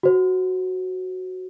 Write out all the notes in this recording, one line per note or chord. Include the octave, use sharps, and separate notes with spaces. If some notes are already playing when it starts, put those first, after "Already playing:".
F#4 C5